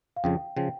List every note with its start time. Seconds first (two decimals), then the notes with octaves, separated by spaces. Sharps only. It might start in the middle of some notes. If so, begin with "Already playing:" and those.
0.16 F5
0.24 F2 C#3 F3 G5
0.57 C#3 F3 G5